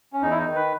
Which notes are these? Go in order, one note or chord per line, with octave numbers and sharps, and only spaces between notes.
C#4
E2 D#4
E4
D#4
D#3
B4